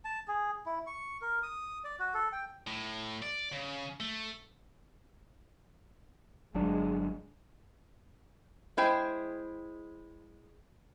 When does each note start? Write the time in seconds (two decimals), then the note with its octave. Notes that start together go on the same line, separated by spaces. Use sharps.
0.05 A5
0.28 G#4
0.66 E4
0.87 C#6
1.21 A#4
1.43 D#6
1.84 D5
1.99 F#4
2.14 A4
2.32 G5
2.67 A2
3.23 D5
3.53 C#3
4.00 A3
6.54 G1 F#3 G#3 D4
8.77 G#3 E4 C5 G5